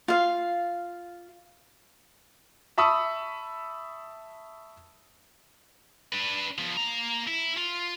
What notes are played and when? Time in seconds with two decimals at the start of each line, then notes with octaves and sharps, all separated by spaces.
0.08 F4 F5
2.78 E5 A5 B5 C#6 D#6 E6
6.12 D4 B4
6.58 F3 B3
6.77 A#3 A#5
7.27 E4
7.57 F4